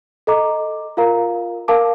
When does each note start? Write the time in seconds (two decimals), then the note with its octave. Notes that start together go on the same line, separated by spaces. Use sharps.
0.27 A4 D#5 A#5 D6
0.97 F4 A#4 F5 A#5
1.68 A#4 F5 A5 D6